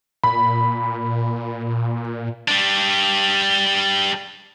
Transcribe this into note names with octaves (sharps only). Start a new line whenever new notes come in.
A#2 B5
G3 D4